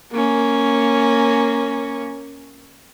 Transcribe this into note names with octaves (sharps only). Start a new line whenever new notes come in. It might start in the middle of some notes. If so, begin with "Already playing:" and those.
A#3 C#4